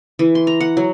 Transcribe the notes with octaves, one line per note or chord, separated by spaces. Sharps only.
E3
C6
A#5
F#5
F#3